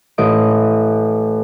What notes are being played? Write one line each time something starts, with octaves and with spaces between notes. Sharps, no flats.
A1 D#5 D7